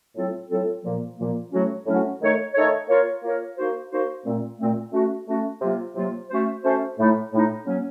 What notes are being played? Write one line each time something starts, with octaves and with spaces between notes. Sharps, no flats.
A2 F#3 C4 F4 A4
A2 F#3 C4 F4 A4
A#2 F3 A#3
A#2 F3 A#3
A2 F#3 A3 C#4 F#4
A2 F#3 A3 C#4 F#4
D#3 A3 D#4 A4 C#5
D#3 A3 D#4 A4 C#5
A#3 F4 A#4 C#5
A#3 F4 A#4 C#5
A#3 D#4 F#4 C5
A#3 D#4 F#4 C5
A#2 A3 C4
A#2 A3 C4
A3 C#4 F#4
A3 C#4 F#4
C3 F#3 A#3 F4
C3 F#3 A#3 F4
A3 C#4 F#4 C5
A3 C#4 F#4 C5
A2 A3 D#4
A2 A3 D#4
F#3 A#3 C#4